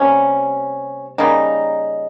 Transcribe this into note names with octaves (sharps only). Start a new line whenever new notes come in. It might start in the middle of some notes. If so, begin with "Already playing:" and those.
Already playing: C3 G3 A#3 C#4
C#3 G3 A#3 D#4